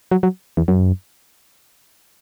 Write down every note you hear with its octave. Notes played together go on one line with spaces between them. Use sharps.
F#3
F#3
E2
F#2